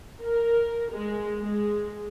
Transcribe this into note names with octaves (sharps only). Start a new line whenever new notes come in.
A#4
G#3
G#3